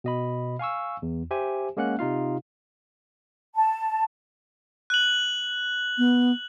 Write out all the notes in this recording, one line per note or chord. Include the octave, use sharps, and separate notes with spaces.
B2 D#5 B5
F5 G#5 C#6 E6
E2
G4 C5 E5 G#5
G#3 A#3 C#4 F#5 F#6
C3 D#4 F4 F5
A5
F#6 F#7
B3